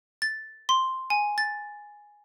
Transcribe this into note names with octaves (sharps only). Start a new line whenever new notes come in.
A6
C6
G#5
A6